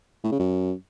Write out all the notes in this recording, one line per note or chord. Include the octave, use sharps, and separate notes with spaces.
A2
C#3
F#2